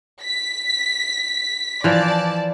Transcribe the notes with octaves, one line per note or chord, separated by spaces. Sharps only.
B6
E3 F3 D5 A5